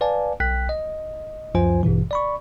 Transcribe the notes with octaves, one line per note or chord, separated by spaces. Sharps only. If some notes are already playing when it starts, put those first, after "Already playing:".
B4 D5 F5 G#5 A5
B1 G5 F#6 B6
D#5
C#2 F#2 F3 F4 C5 G#5
A1 G2 B2 E3
D5 B5 C#6